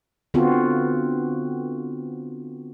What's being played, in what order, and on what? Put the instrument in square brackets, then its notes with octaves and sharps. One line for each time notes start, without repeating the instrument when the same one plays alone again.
[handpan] D3 B3 C4 F4 F#4